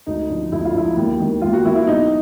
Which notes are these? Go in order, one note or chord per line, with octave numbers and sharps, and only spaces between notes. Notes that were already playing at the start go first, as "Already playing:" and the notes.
D2 D#4
D3 F3
D2 E4
F4
D3 F3 E4
D#2
D#3
D#2 F4
F#4
D#3 E4
E4
B1 D#4